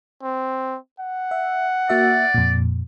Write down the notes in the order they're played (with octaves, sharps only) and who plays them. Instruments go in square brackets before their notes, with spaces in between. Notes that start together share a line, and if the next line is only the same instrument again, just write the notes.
[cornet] C4
F#5
[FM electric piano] E5
[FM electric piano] A#3 F#4 E5 [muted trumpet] D5
[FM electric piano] F2 A#2